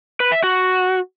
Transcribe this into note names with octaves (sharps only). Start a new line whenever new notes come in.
B4
E5
F#4